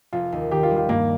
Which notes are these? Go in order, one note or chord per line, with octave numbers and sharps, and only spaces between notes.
F1 F4
D#2
D#3 G4
F4
G3
F4
G2 A#3